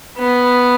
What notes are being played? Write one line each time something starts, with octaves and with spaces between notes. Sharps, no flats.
B3